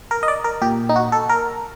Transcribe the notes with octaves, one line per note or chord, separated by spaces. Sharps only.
A#4
D#5
D5
A#4
A#2 G4
D#4
F#4
A4
A#4